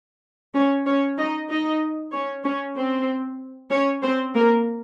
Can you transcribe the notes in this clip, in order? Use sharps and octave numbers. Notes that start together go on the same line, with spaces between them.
C#4 C#5
C#4 C#5
D#4 D#5
D#4 D#5
C#4 C#5
C#4 C#5
C4 C5
C#4 C#5
C4 C5
A#3 A#4